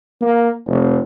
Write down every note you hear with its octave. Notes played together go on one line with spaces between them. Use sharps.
A#3
F1